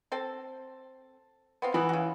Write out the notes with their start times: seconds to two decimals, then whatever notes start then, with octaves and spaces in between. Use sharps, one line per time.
0.12 C4 A4
1.62 B3 C4 F4
1.74 E3 B3 B5
1.89 C#3 F#4